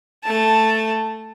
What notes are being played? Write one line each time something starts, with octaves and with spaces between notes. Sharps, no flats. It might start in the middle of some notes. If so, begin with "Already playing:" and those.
A3 A5